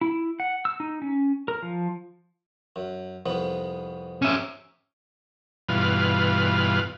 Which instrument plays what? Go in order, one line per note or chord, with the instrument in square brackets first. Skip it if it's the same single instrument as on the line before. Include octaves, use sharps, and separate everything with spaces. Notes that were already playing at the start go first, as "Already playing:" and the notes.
[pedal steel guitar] E4
F#5
E6
D#4
C#4
A#4
F3
[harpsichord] F#2
C2 F2 B3
[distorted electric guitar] C#4 E5
[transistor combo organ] G2 B2 E3 F4 B4 F6